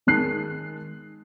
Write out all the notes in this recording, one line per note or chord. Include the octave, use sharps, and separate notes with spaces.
D#3 G#3 A5 F#6 C7